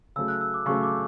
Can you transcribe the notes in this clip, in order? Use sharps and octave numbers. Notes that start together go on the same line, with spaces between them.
C#3 F#3 A3 E6
F#6
E6
D6
C#3 F#3 A3 C#6
D6